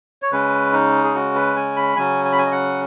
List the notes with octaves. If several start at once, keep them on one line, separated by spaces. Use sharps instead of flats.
C#5
C#3 G#3 C#4 B4
D#4
G#4
F#4
B4
G#5
B5
C#3 F#3 C#4 G#5
G#5
B5
G#5
D#5
F#5